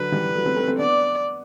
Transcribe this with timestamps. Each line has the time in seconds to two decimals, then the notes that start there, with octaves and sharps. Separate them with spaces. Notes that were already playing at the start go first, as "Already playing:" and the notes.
Already playing: D3 F#3 B4
0.12 E3 G3
0.35 F#3 A3
0.46 A3 C4
0.56 A3 C4
0.68 A3 C4
0.78 B3 D4 D5